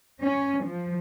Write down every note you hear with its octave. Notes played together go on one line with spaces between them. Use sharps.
C#4
F3